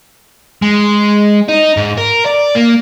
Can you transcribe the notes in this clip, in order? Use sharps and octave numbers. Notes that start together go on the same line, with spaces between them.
G#3
D#4
G#2
A#4
D5
A#3